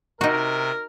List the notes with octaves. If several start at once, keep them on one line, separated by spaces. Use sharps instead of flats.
C3 D#4 F#4 A#4